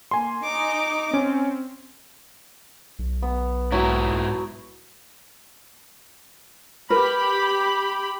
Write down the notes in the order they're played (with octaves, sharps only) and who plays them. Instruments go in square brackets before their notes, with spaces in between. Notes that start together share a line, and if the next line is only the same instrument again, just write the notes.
[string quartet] A#3 [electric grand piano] G#5 C6
[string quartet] D#4 D#5 D6
[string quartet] C4 [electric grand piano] C#4
[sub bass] B1
[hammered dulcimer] B3
[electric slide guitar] G#2 E4 [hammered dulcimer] F#3
[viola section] G4 B5 [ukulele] A#4 B4